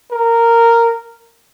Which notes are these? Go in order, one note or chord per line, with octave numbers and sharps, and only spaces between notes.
A#4